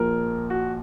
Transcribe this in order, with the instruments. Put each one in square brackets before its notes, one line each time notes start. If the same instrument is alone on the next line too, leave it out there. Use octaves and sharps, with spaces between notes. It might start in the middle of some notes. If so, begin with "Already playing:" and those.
Already playing: [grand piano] A#1 A#2 F3 A#4
F#4